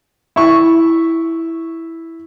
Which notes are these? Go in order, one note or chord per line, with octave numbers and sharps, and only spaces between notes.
E4 C#6